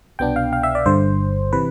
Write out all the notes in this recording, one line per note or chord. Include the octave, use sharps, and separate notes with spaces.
C2 B2 B3 D4 G5
F5
F5
E5
D5
G1 G2 D3 C5
C3 E3 B4